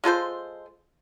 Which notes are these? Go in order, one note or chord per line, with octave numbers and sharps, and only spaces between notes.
G#3 F4 A4 C5